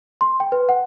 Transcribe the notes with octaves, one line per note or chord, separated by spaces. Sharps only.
C6
G5
B4
F#5